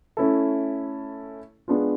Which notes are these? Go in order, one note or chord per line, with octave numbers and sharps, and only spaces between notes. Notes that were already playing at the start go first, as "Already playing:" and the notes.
A3 C#4 E4 A4
G#3 B3 D4 F4